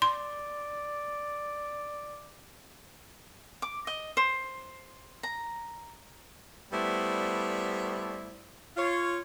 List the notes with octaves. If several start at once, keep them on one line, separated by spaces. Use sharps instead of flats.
D5 C6
D6
D#5
C5
A#5
G3 A3 B3 E4 C5 D5
F4 C#5